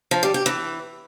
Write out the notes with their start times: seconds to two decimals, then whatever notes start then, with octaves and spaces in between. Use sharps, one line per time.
0.11 F3
0.23 G3
0.34 G4
0.46 E3